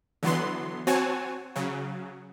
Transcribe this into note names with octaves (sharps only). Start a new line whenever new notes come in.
D3 E3 F#3 B3 C6
C4 F#4 C#5 G#5 A5
C#3 F#3